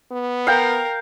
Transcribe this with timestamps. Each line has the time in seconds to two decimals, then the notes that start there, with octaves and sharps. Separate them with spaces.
0.12 B3
0.47 A#4 F5 G5